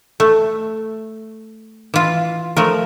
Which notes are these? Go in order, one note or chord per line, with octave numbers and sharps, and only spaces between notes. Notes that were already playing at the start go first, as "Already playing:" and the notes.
A3
E3 F4
F3 A3 A#4